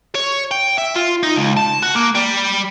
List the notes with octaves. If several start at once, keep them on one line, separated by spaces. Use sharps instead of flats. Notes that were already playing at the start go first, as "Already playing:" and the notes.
C#5
G5
E5
F4
D#4
C#2
A5
F#4
A#3
G3